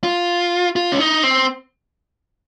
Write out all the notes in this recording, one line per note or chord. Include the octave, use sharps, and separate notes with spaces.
F4
F4
C#4
D#4
C4